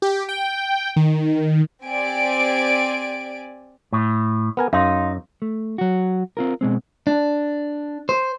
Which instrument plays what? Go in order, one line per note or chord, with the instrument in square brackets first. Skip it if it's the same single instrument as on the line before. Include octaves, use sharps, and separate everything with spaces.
[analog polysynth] G4
G5
D#3
[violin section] C4 G4 D5 G#5 D7
[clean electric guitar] A2
[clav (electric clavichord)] B3 A#4 G#5
[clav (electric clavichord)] F#2 [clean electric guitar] D#4 [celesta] F5 C6
[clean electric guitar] A3
F#3 F#4
C4 F4 A#4
B2 G#3 C4
D4
C5